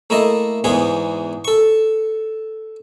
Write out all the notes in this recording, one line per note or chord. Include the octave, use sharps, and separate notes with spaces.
A3 A#3 E4 A4 D#5
E2 G#2 E3 B3 G#4
A4 C#6